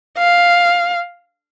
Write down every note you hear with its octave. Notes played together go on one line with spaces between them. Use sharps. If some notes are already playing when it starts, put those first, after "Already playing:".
F5